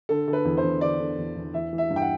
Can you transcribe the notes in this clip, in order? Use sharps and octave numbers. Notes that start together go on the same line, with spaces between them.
D3 A4
D3 A4
B4
E2
C5
E2
D3 D5
D3
E2
E2
E3 E5
E3
E5
G2
G5
F#5